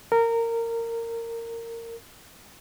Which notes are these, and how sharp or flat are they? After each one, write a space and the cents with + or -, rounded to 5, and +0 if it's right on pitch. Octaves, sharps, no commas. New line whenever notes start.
A#4 -20